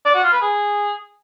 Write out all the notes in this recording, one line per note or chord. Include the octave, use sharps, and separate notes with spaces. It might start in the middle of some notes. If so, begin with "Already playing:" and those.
D5
F#4
F4
B4
G#4